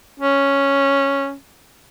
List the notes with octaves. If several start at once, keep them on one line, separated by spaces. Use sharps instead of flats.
C#4